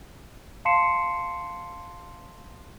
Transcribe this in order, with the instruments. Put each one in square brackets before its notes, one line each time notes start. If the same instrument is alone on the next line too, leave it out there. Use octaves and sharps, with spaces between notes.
[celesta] F5 A5 C6 C7 C#7 E7